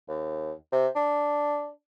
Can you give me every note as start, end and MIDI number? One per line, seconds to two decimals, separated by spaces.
0.08 0.52 39
0.72 0.87 48
0.96 1.70 62